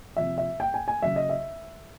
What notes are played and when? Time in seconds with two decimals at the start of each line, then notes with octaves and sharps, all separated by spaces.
0.17 C3 F3 E5
0.38 E5
0.60 G5
0.74 G#5
0.88 G#5
1.02 C#3 F#3 E5
1.16 D#5
1.29 E5